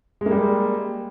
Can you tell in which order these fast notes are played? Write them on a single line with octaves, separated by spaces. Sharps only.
G#3 A#3 G3